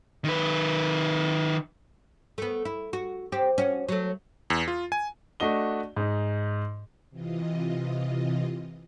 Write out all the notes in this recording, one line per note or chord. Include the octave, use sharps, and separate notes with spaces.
D#3 B4
A3 B3
E4
F#4
C4 G4
C#4 F#4
F#3 A3
E2
F4
G#5
A3 D4 F#4 D#5 G7
G#2 D#4
C3 E3 F4 D#5